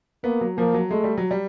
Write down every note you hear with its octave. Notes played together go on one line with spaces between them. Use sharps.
A#3 B3
F#3
F3 A#3
F#3
G#3 A3
G3
F#3
G3